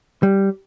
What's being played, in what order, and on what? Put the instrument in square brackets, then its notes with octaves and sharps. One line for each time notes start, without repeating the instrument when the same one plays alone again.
[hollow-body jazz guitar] G3